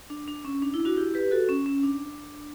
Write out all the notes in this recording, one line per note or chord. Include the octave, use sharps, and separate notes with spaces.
D4
D4
C#4
D4
E4
D4 F#4
E4 G4
G4 B4
F#4 A4
C#4
C#4
D4